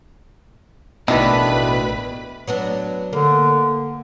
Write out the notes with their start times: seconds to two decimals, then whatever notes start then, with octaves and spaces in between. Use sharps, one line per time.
1.08 A1 B2 D#3 E3 D4 E4 B4 B5
2.48 F#3 B3 D4
3.13 D3 A#3